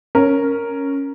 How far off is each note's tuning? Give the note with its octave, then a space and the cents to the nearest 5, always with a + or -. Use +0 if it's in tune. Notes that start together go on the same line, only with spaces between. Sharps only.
C#4 +0 A#4 +0